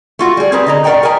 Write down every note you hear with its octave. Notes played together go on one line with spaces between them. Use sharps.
A3 F4 F#4
G3 G#4
C4 G4 G#4 A#4 B4
D3 D#5 A#5
A2 A#4 D5 F#5 G5 A#5
G#4 A#4 B4 G5 G#5 A#5